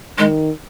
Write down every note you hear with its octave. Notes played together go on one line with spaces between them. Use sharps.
D#3 G#3